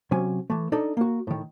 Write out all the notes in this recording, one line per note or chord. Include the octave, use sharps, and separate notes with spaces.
C3 F#3 C#4 G#5
E3 A3
D4 D#4 A4 D5 D#5
A#3 F#4
A2 D#3